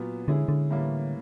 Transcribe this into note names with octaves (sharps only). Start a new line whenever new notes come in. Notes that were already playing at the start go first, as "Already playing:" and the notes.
Already playing: A#2 F#3 B3
D3 G#3 C#4 E4 G#4
D3
A2 E3 G3 A#3 C#4